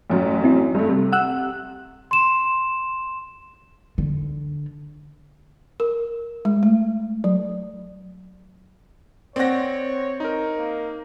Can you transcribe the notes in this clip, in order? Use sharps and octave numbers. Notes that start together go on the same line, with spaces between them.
A1 F#2 F#3
C4 E4
G2 G3 A3
C3
F#5 E6 F#6
C6 E7
D3
A#4
G#3
A3
F#3
C4 C#5 D5 F#5 A#6
D#4 A#4
A#3